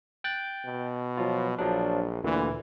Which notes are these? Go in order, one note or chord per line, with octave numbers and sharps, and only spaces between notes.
G5 F#6 A6
B2
F3 F#3 F4
A#1 F3 F#3 D4
D2 A#2 D3 E3